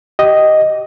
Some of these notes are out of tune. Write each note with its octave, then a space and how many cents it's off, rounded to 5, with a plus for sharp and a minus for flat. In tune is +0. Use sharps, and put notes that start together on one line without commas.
G4 -20 D#5 +0